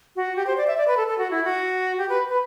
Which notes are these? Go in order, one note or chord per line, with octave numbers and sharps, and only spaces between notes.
F#4
G4
C5
D5
E5
D5
B4
A4
A4
F#4
E4
F#4
G4
B4
B4